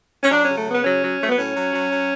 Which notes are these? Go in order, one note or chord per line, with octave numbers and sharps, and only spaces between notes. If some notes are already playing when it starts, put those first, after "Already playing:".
C#4
F#3 D4
C#3 C#4
A3
C#3 B3
F#3 C#4
F#3
F#3 A3
B3
A2 C#4
F#3
F#3
F#3